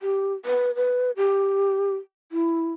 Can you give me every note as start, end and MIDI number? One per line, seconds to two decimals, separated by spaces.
0.01 0.33 67
0.45 0.74 71
0.76 1.11 71
1.17 1.95 67
2.32 2.72 64